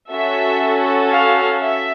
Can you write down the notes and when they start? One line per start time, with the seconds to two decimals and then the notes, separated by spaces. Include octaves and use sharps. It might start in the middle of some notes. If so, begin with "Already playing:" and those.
0.10 C#4 F#4 A4 E5
1.12 F5
1.63 E5